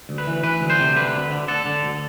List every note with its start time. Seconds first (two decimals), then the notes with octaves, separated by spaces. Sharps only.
0.09 D2
0.18 B4
0.27 E3
0.43 E3 B4
0.61 D2
0.70 C5
0.79 C3
0.95 D3 B4
1.13 D2
1.31 D3
1.48 D3 A4
1.66 D3
1.83 D2